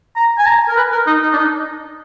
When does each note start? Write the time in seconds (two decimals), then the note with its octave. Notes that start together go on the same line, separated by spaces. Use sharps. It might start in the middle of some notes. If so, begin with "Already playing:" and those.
0.16 A#5
0.39 G#5
0.46 A#5
0.68 A#4
0.77 B4
0.92 A#4
1.07 D#4
1.22 D#4
1.33 D4
1.37 D#4